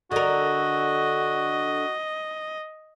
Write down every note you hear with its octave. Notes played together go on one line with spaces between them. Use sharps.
D3 F#4 A#4 D#5